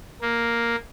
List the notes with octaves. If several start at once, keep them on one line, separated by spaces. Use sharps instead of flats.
A#3